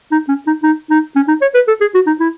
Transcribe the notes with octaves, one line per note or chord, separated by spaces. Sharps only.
D#4
C#4
D#4
D#4
D#4
C#4
D#4
C#5
B4
A4
G#4
F#4
D#4
E4